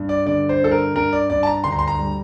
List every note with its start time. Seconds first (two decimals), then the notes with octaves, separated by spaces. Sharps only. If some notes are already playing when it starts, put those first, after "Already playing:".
Already playing: G2
0.09 D5
0.26 D3 D5
0.49 C5
0.60 G2 A4
0.71 A#4
0.95 G2 A#4
1.13 D5
1.30 G2 D5
1.43 A5
1.47 A#5
1.64 D2 C6
1.72 A#5
1.79 C6
1.88 A#5
1.99 G3